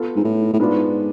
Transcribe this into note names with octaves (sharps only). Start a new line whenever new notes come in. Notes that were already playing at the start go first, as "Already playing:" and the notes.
Already playing: B3 F4 A4
G#2
A2
A2
G#2 B3 D4 F4 B4 D5